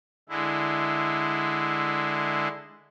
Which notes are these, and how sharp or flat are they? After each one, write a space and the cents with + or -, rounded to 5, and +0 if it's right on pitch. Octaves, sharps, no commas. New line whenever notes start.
D3 +10 G#3 +0 E4 +0